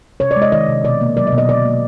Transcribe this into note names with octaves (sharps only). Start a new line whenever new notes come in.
C3 C#5
D5
G#3
D#5
D#3 D#5
C3
B2 D5
A#3
F#3 D5
D#5
B2
D#5
D3 D5
A#3